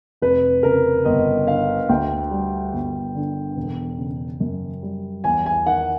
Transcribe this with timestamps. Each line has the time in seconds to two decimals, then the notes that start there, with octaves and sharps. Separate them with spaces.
0.22 F1 B4
0.63 C#3 A#4
1.05 G1 D#5
1.47 D3 F5
1.89 D2 G5
2.31 G3
2.73 G1
3.15 D3
3.56 E1
3.99 C#3
4.40 F#2
4.83 G3
5.24 E2 G#5
5.46 G#5
5.66 D#3 F#5